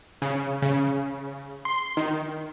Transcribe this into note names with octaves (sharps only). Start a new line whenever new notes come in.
C#3
C#3
C6
D#3